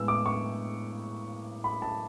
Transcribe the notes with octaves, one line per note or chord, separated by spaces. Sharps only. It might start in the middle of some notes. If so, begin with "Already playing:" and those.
Already playing: A2 G#3 B3 E6
D6
C#6
B5
A5